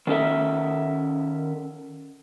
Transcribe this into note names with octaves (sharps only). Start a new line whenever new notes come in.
D#3 C#4 A4 E5